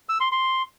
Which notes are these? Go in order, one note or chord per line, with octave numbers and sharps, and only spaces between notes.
E6
C6
C6